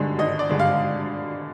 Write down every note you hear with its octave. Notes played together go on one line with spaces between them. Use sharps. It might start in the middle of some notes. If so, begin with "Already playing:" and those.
Already playing: G#1 G2 D3 G#3
G#1 D#5
D5
G2 D3 G#3
F5